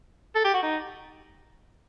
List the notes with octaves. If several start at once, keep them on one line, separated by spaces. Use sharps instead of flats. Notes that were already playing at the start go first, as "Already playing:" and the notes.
A4
G4
F#4
D#4